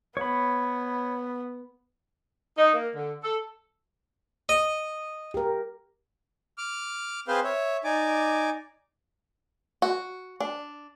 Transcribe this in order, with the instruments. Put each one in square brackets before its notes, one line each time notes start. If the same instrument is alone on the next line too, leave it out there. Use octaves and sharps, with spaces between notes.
[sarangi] B3 [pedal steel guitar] C#5 B5
[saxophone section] D#4
A#3
D3
A4
[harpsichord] D#5
[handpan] G4 A#4
[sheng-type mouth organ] D6 F6
C4 G#4 B4 C5 F5 C6
C#5 E5
D#4 D5 G#5 D6
[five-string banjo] F#4
D4